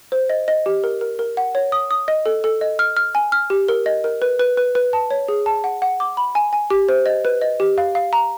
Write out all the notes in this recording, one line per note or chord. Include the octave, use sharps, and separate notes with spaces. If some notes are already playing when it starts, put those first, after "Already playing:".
C5
D#5
D#5
G4
A#4
A#4
A#4
F#5
C#5
D#6
D#6
D#5
A4
A4
D#5
F6
F6
G#5
F6
G4
A#4
D#5
A#4
B4
B4
B4
B4
A5
C#5
G#4
A5
F#5
F#5
D6
B5
G#5
G#5
G4
C5
D#5
B4
D#5
G4
F5
F5
A#5